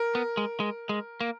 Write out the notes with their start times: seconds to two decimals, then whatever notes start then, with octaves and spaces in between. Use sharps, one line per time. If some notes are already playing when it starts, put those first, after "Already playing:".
Already playing: A#4
0.15 B3
0.37 G#3
0.60 G#3
0.89 G#3
1.21 A#3